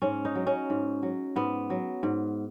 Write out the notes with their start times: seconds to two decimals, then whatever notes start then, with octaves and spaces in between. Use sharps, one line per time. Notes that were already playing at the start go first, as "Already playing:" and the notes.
0.02 G#2 C#4
0.25 D#4
0.35 F#3
0.47 C#4
0.70 G#2
1.03 F#3
1.36 G#2 B3
1.70 F#3
2.03 G#2